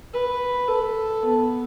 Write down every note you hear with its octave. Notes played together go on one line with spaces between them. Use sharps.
B4
A4
B3